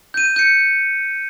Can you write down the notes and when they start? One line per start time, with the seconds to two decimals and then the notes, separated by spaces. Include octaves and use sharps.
0.14 G6 D#7
0.36 G6 C#7